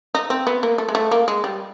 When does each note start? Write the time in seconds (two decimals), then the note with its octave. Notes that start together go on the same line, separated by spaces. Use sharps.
0.15 D#4
0.30 C4
0.47 B3
0.63 A#3
0.78 A3
0.89 G#3
0.95 A3
1.11 A#3
1.28 G#3
1.44 G3